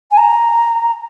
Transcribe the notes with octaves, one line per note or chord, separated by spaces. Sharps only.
G#5
A#5